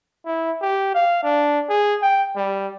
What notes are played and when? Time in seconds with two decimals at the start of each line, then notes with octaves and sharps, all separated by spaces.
0.26 E4
0.61 G4
0.95 F5
1.23 D4
1.69 G#4
2.02 G5
2.36 G3